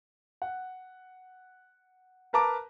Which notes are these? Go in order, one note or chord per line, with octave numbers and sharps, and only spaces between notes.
F#5
A#4 B4 A5 A#5 D6